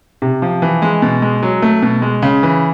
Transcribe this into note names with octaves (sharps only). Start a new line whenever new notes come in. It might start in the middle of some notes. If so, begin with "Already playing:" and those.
C3
F3
E3
G#3
B2
G#3
F#3
A3
B2
G#3
C#3
E3